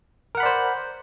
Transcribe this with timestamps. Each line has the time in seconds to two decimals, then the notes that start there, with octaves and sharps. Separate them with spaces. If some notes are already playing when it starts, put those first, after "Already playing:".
0.35 A#4
0.37 F#5
0.40 B5
0.43 D5
0.46 C5